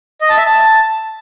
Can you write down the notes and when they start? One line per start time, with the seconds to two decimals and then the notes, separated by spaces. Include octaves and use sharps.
0.21 D#5
0.29 A5
0.37 E5
0.46 A5